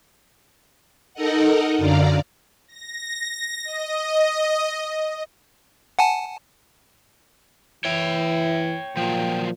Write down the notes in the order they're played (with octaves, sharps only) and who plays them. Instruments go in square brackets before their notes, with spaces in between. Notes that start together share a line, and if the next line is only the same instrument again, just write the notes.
[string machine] D#4 A4 A#4 D#5 F#5
F#2 D3 D5 F5 A#5
[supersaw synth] A#6
D#5
[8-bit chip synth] F#5 G#5 A5
[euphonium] E3 [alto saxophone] E4 [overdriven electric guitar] C#5 G5
[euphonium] A#2 [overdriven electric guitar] F3 F#3 [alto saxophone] G5